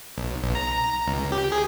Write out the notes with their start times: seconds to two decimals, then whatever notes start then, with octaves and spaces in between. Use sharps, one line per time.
0.18 B1
0.43 B1
0.55 A#5
0.72 A#5
1.06 C#2
1.32 G4
1.52 G#4